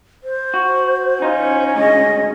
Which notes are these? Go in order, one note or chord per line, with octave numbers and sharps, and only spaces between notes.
C5
F#4
C#4 D#4 F4
D2 G#2 C#3 D#5